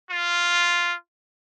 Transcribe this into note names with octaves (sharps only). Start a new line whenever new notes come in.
F4